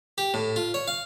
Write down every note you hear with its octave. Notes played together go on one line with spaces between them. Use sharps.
G4
A2
F4
C#5
F5